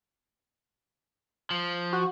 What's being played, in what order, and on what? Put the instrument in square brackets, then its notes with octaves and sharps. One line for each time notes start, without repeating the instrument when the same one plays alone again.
[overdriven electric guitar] F3
[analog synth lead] F#4